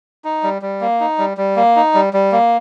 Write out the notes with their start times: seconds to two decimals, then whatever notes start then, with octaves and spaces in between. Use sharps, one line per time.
0.25 D#4
0.43 G3
0.62 G3
0.81 A#3
1.00 D#4
1.18 G3
1.37 G3
1.56 A#3
1.76 D#4
1.94 G3
2.13 G3
2.32 A#3